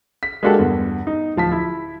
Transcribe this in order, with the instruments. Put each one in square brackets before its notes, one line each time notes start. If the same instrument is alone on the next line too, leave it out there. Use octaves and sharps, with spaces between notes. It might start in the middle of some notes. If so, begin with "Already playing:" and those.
[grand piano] B6
G#3 A#3 D4 F#4 G4 A4
E2 G2
D#4
D1 F3 A5 B6
E4